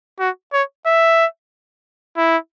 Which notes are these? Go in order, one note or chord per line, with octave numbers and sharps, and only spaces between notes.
F#4
C#5
E5
E4